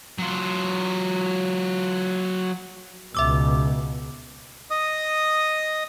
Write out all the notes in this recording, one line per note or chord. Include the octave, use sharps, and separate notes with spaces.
F#3 F4
C#2 B2 E5 D6 E6
D#5 D#6